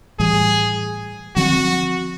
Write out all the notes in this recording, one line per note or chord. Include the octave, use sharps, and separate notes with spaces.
A2 E3 G3 G#4
D3 F3 A3 C4 F#4